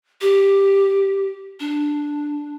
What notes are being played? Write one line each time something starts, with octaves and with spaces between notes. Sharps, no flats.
G4
D4